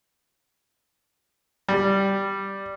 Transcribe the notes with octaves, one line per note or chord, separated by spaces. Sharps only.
G3